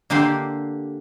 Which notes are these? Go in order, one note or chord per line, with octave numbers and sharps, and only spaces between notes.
D3 A#3 D4 G4 C6